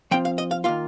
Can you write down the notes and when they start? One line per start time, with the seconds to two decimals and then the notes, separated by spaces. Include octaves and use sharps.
0.11 F3 C4 F4 G5
0.25 F5
0.38 D#5
0.51 F5
0.64 D#3 A#3 F4 F5